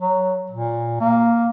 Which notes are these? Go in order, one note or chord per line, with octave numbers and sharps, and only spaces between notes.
F#3
A#2
A#3